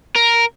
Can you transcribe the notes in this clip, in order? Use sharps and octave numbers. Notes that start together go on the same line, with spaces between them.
A#4